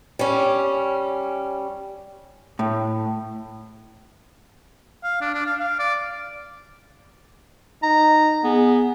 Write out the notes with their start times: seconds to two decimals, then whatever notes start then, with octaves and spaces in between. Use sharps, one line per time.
0.19 G3 C#4
2.59 A2
5.04 F5
5.21 D4
5.34 D4
5.46 F5
5.60 F5
5.79 D5
7.83 D#4 A#5
8.44 B3 G#4